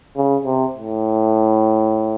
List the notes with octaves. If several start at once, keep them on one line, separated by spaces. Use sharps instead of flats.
C#3
C3
A2